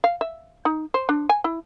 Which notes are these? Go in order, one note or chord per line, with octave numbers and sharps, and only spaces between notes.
F5
E5
D#4
C5
D4
G#5
E4